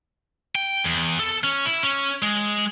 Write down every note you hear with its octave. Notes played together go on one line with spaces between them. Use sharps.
G5
E2
A4
C#4
E4
C#4
G#3